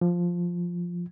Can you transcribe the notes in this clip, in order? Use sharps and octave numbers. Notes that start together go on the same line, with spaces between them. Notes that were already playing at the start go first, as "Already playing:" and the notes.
F3